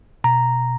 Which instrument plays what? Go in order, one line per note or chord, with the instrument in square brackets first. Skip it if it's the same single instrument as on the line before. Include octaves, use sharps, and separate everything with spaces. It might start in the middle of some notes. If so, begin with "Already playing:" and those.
[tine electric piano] B2 A#5